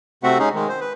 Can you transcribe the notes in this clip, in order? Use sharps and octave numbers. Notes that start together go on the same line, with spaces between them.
C3 A3 C4 F#4 E5 F#5
G#3 C#4 D#4 G#4
D#3 G#3
C5
B4